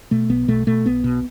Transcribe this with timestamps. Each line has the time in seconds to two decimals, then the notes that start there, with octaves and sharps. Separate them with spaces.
0.11 B2 A3
0.29 B1 B3
0.48 B2 A3
0.67 B2 A3
0.86 B1 B3
1.04 B2